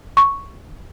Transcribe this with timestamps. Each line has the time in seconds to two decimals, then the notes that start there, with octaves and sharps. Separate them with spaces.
0.17 C#6